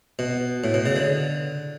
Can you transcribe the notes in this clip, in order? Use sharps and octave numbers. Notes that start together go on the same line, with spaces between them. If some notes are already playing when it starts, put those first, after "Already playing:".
B2
A2
B2
C#3
D3